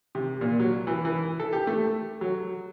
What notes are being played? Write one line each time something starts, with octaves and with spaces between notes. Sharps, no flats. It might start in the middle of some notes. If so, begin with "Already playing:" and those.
C3
A#2
F#3
E3
E3
A4
G4
A3
F#3